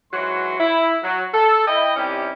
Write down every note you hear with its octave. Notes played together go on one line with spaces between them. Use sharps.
G#2 E3 F#3 F#4 C#5 C6
E4
F#3
A4
E4 D#5 G5
C3 D#3 G3 C#4 E4 G4